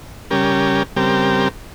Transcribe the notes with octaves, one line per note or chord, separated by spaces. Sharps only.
C#3 G3 C#4 G4 A#4
C#3 G3 C4 G4 A#4